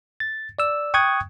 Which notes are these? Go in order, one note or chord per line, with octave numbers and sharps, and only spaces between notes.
A6
D5 E6
G5 C#6 D#6 F#6 G#6